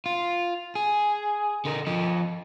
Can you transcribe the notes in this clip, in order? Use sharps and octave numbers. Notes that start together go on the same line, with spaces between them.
F4
G#4
D3 A#4
F3 D#5